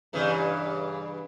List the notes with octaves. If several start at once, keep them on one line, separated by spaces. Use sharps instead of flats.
G2 C#3 E3